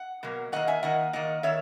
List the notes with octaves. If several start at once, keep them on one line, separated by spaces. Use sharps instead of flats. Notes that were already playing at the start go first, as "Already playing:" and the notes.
Already playing: F#5
B2 F#3 A#3
D#3 A#3 D#5 F#5
E5 G#5
D#3 A#3 D#5 F#5
D#3 A#3 D#5 F#5
D#3 C#5 E5